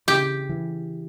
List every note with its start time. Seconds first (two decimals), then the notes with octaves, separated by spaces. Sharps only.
0.08 C#3 G4
0.49 E3